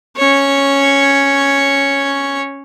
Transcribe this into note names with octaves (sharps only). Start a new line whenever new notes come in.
C#4 C#5